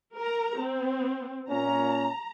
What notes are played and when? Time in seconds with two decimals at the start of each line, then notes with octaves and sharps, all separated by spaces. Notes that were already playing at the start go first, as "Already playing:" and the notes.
0.15 A#4 A#5
0.58 C4
1.49 A#2 C#4 A#5